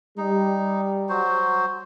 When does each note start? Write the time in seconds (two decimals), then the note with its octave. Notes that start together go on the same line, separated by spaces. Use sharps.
0.18 G3 D#4
1.09 F#3 F#4 C5